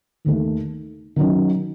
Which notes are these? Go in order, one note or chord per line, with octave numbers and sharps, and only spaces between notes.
D#2 D#3 A3
D#3 F#3 C#4